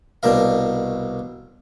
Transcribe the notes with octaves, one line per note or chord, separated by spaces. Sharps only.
C2 B2 D4 A#4 F5